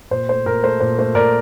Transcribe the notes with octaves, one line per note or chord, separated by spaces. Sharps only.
A#2 C5
A3 C5
A#2 A#4
A3 C5
A#2 C5
A3 C5
A#2 A#4 D5